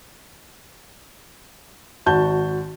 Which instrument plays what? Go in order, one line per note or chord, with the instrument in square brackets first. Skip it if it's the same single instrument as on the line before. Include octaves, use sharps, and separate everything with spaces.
[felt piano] G#1 F#4 A5 G6